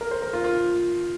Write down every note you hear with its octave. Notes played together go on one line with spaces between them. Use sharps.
A#4
C5
A#4
F4
F4